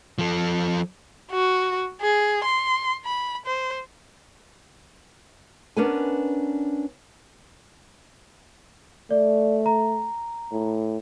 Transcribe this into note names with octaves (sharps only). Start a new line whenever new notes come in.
F3 A4
F#4
G#4
C6
B5
C5
B3 C#4 D4 A#4 B4 G#5
A3 D5
A#5
A2